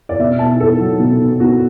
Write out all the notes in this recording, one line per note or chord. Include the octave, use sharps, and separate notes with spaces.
D5
B2 E5
B2 A5
B3 A4
F#3
B2
B2
B3 F#4